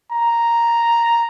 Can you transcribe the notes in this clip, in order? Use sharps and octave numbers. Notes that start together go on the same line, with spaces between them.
A#5